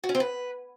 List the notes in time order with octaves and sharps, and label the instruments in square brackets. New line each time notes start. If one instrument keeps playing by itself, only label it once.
[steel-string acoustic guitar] F#4
C#4
C4
B4